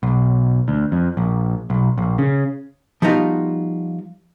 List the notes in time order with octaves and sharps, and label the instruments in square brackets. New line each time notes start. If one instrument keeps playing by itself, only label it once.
[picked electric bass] B1
D2
F2
A#1
B1
A#1
C#3
[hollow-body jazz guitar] F3 G3 B3 D#4 F4 F#4